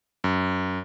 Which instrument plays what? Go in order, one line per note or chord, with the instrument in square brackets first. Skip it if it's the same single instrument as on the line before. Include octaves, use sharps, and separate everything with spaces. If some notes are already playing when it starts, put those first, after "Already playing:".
[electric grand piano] F#2